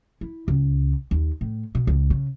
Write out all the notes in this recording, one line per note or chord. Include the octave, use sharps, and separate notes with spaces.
E4
C#2
D#2
A2
B2
C#2
C#3